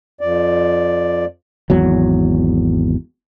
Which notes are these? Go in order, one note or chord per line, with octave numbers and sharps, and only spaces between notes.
F2 D5
G#1 E2 F#3